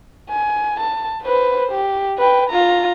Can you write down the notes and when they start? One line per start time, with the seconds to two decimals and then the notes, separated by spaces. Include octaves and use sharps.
0.30 G#5
0.80 A5
1.23 B4 C5
1.72 G4
2.18 B4 G5
2.50 F4 A#5